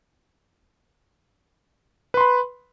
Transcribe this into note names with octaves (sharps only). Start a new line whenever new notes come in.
B4 B5 C6